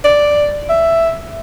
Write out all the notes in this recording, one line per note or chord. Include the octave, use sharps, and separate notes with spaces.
D5
E5